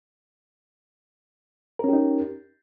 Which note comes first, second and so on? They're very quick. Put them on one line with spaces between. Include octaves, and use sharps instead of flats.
A#4 C#4 G4 D#4